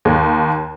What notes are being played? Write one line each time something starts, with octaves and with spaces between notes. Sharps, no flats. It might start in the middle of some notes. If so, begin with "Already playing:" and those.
D#2